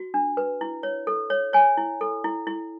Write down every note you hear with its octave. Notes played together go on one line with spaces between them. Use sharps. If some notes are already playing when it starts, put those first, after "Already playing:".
Already playing: F#4
D4
B4
E4
C#5
A4
C#5
C#5 G#5
E4
A4
E4
E4